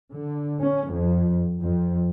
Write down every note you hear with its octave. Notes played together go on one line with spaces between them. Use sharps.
D3
C#4
F2
F2